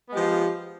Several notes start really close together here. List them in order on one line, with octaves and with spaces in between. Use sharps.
B3 G#3 G4 F3 F4